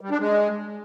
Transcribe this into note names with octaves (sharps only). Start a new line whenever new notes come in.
G3
D4
G#3